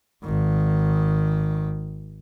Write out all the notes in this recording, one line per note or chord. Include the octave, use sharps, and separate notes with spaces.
G#1 D#3